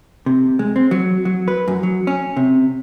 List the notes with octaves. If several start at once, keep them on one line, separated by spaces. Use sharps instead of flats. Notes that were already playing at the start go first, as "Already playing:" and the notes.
C3
G#3
C4
F#3
F#3
B4
F#2
F#3
C#4
C3